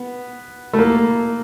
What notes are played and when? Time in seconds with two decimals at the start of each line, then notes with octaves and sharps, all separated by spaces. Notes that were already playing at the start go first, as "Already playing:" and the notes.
Already playing: B3
0.74 A3
0.79 A#3